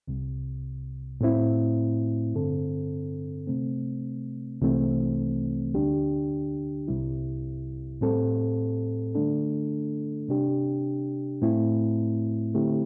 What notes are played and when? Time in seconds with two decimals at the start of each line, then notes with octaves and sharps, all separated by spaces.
0.08 C2 C3 G3
1.21 A2 A3 C4 E4
2.34 G2 D3 C4 A4
3.47 C3 A3 C4
4.61 C2 C3 E3 A3 C4
5.74 D2 D3 G3 D4 G4
6.88 C2 C3 G3 E4
8.01 A2 G3 C4 A4
9.15 D3 A3 D4 A4
10.29 C3 G3 D4 G4
11.42 A2 A3 C4 E4
12.55 D3 A3 C4 E4 G4